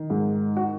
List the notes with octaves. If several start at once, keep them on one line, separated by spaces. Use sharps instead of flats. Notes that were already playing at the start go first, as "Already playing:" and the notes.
Already playing: D#3
G#2
F#4